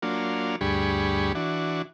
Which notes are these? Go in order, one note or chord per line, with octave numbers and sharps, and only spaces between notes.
F#3 A#3 D4 F4
D2 G2 G3 G#4 B5 C#6
E3 D4 F#4